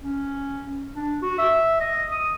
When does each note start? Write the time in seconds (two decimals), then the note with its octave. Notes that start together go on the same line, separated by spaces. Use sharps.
0.02 C#4
0.94 D4
1.22 F#4
1.38 E5
1.80 D#5
2.11 D#6